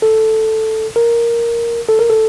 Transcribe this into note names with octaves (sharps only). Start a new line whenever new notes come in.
A4
A#4
A4
A#4
A4